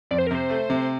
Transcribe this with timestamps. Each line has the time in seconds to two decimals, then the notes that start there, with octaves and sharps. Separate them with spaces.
0.11 F2 D5
0.18 C5
0.27 A#4
0.31 C3 C5
0.50 A3
0.70 C3